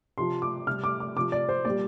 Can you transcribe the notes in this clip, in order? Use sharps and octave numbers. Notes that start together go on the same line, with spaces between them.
C3 F3 C6
D6
C3 G3 F6
D6
D6
C3 F3 D6
D5
C5
A#2 G3 D5